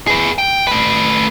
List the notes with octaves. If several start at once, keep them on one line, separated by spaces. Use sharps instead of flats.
G#4 B4
G5
A3 B4